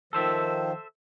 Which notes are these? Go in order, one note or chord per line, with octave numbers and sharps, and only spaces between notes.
D#3 F3 A4 C5 E5